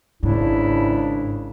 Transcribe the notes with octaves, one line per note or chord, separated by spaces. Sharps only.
G#1 G#2 C#3 D4 E4